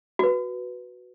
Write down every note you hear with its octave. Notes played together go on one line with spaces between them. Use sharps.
F#4 B4